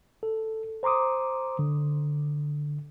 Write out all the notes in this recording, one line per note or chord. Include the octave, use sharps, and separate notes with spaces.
A4
C5 A#5 C6 D6 D#6
D3